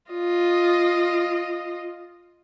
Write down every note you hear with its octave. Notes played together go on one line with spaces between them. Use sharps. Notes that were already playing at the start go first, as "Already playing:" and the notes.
F4 D#5